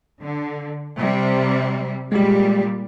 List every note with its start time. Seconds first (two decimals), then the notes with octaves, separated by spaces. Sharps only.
0.21 D3
0.98 C3 G3
2.12 A#2 G3 G#3 G4